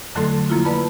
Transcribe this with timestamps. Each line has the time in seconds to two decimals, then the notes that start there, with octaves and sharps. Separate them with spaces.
0.15 F2 D3 F#3 A3 A4 C6
0.49 F3 A#3 E4 F4
0.65 B4 D5 A5 B5